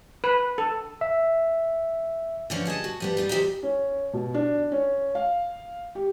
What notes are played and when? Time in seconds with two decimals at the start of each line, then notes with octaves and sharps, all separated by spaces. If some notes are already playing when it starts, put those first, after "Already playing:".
0.24 B4
0.58 A4
1.01 E5
2.50 D3 E3 F3 C#4 D4
2.65 G2 G#4 D#5 A5
2.84 F#4
3.00 F3 G3 B3
3.17 G3 D#4 F4
3.29 E2 E3 G4 C5 D#5 A#5
3.63 C#4
4.13 B2
4.34 D4
4.72 C#4
5.15 F5
5.95 G4